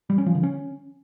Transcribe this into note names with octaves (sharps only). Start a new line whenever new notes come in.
G3
C#4
F3
D3
C#4